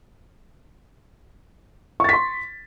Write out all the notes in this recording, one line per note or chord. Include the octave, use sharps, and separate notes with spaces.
C6 C#6 A6 B6